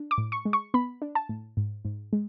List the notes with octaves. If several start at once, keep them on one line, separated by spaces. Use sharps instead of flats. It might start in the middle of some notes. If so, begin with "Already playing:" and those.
Already playing: D4
D6
A2
C#6
G#3
C#6
B3 B5
D4
A5
A2
G#2
G#2
G#3